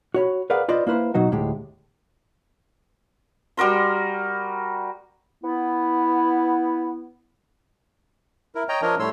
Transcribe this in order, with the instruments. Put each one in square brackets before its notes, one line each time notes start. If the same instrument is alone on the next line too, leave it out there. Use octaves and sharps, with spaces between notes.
[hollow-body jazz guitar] F#4 C#5 B5
G#4 A#4 B4 D5 F5 F#5
F4 B4 C5 D5 D#5
A#3 E4 B4 C5
B2 F#3 D#4 F#4
D2 A2 G#3 G4
[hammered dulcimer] G3 F#4 A#4 C6
[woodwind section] B3 E4
[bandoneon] E4 A#4
C#5 D#5 G5 A#5
F3 D4 A#4 C#5 D#5
A2 G3 A3 C#5 C6 E6